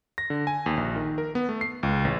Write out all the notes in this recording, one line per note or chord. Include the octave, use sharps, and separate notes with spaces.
A#6
D3
G#5
D#2
A#1
D#3
A#4
B3
A3
C7
C#2
A1